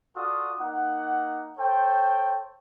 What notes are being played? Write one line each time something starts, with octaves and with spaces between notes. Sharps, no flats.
F4 F#4 A4 D5 D#6
A#3 D#4 F#5
A4 C5 C#5 G5